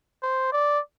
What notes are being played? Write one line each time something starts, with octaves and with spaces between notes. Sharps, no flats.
C5
D5